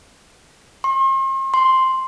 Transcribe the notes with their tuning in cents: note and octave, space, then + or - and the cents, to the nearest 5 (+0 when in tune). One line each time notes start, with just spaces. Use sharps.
C6 +45
C6 +0